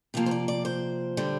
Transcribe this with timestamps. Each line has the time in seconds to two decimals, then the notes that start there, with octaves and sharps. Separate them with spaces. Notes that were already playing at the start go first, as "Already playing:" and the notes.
0.14 C3 F3 A#3 F4
0.26 C5
0.31 D5
0.48 D5
0.65 C5
1.17 D3 G3